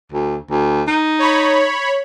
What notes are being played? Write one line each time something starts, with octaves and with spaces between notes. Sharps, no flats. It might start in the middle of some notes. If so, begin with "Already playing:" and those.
D2
D2
D#4
C#5 B5